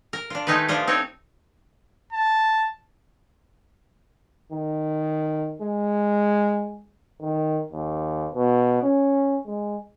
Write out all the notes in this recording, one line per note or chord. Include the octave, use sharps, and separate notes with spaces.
A#4
D4 F4
D#3 G#3 A3 D#4 G4 B4
F3 D4 F4 D#5
C4 D#4 C#5
A5
D#3
G#3
D#3
D#2
B2
C#4
G#3